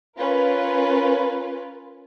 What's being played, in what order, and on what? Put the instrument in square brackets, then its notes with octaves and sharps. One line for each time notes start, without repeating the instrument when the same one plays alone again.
[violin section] C#4 F4 A#4 B4